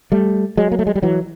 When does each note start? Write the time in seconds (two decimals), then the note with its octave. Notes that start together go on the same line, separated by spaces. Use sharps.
0.12 G3 A3
0.57 F#3 G#3
0.72 A#3
0.79 A3
0.87 G#3
0.95 G3
1.03 E3 F#3